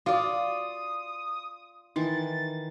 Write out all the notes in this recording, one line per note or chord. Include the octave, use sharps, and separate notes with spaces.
F4 F#4 D5 F5 D#6
D#3 E3 D#4 A6